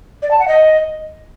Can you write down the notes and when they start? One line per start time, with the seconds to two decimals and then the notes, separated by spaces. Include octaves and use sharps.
0.22 D5
0.31 A5
0.39 F#5
0.48 D#5